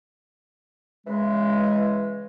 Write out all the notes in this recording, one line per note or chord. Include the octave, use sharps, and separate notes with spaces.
C#3 E3 G#3